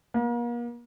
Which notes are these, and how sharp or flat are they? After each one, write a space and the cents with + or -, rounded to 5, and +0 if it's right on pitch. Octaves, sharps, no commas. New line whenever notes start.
A#3 +40